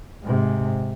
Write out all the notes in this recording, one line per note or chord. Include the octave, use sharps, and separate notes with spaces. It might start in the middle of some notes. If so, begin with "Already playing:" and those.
G#2 C3